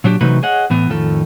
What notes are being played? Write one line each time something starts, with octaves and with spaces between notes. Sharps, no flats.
A#2 F#3 D4 G4
C3 E3 F#3 A3 D#4 B4
G#4 C#5 D#5 F#5
A2 E3 B3
F2 A2 D#3 F4 A4